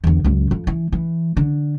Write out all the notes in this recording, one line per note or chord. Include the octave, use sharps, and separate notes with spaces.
E2 D3
C#2 F#2
F2
E3
E3
D3